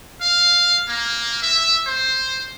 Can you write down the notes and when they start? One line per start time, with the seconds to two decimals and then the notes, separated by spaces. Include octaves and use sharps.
0.21 F5
0.88 A#3
1.42 E5
1.87 C5